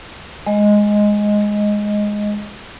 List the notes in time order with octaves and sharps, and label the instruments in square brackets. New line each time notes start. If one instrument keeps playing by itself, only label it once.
[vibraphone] G#3 D#5